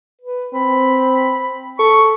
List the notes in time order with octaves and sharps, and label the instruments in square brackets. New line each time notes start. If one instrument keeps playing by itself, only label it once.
[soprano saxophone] B4
[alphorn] C4 [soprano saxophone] B5
[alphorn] A4 [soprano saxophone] C#6